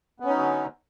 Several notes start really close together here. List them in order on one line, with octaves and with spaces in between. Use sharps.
B3 C#4 D#4 F#3 D3